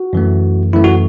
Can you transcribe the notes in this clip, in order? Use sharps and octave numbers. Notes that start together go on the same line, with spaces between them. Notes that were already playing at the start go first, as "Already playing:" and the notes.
Already playing: F#4
F#2 E3 A3
F#2 E3 A3 E4
F#4